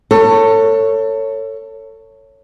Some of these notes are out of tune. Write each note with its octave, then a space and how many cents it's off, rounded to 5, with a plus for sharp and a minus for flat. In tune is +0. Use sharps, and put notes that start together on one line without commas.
A4 +30 C#5 +0